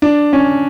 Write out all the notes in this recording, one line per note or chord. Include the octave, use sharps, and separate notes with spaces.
D4
C#4